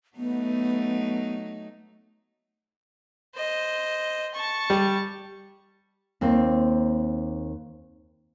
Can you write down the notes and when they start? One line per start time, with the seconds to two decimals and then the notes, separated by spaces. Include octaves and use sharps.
0.17 F#3 A3 B3 D#4
3.35 C5 D#5
4.34 A5 C#6
4.70 G3
6.21 D#2 A#3 C4